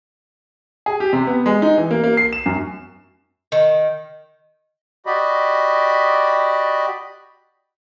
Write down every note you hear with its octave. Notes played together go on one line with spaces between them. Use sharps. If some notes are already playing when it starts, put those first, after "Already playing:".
G#4
G4
C3
B3
G#3
D#4
E3
A#3
A#3
C7
E7
F#2
D#3
F#4 G4 D5 D#5 B5